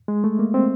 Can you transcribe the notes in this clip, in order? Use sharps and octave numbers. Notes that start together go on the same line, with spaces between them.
G#3
A3
A#3
C4